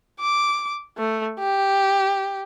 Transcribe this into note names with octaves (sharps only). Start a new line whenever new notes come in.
D6
A3
G4